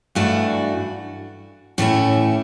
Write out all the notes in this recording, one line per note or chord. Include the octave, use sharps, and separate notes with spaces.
G2 E3 A3 D4 F#4
A2 E3 A3 C#4 E4